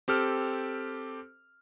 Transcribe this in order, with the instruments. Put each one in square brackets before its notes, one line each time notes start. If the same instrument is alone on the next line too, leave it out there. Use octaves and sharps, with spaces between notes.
[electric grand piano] C4 G4 A4 F6